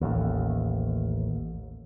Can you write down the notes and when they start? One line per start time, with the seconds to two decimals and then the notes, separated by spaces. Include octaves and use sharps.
0.01 A1 D#2